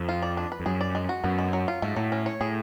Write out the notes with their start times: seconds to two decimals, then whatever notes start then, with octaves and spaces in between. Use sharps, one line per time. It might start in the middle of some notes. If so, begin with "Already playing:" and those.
Already playing: F2
0.09 F4
0.22 D5
0.37 D4
0.52 B4
0.60 F2
0.66 F#2 G#4
0.81 D5
0.95 G#3
1.09 F#4
1.24 F#2 B3
1.38 G#3
1.53 F#3
1.68 F4
1.82 G#2 A3
1.96 A2 F#3
2.12 C#4
2.26 C#5
2.41 A2 G#4